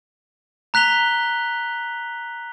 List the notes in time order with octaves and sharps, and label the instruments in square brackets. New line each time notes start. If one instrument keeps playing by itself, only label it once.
[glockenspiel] A#5 F#6 B6 F7 G7